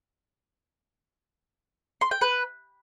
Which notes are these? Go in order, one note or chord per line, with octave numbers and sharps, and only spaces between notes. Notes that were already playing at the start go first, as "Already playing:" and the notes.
C6
G5
B4